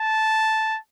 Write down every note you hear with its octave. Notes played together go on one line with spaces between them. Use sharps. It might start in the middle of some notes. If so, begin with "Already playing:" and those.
Already playing: A5